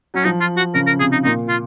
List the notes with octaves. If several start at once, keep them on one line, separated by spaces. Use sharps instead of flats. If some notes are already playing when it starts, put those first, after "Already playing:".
F#3 C#4
F3 D#4
F4
F#4
C#3 A#4
A#4
C3 G#4
D#4
A#2 D#4
F4